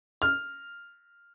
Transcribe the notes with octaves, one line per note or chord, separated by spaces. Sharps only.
F6